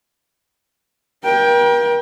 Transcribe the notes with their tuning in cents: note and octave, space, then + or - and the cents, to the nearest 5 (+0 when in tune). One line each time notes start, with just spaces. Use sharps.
A#4 +40 G5 +10